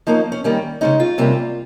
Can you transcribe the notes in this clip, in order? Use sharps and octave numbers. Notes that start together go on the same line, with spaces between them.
F3 A#3 C#4 D#4
C#4
D#3 G3 A#3 C#4
C#3 G#3 C#4 D#4
F4
C3 G3 A#3 C#4